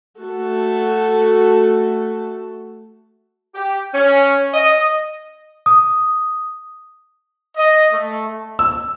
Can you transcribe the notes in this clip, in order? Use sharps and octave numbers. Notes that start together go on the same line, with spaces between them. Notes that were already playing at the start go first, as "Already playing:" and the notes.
A3 F#4 A4
G4
C#4
D#5
D#6
D#5
A3
E6